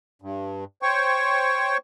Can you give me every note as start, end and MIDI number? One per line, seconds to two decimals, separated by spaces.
0.22 0.64 43
0.82 1.77 72
0.82 1.77 73
0.82 1.77 79
0.82 1.77 85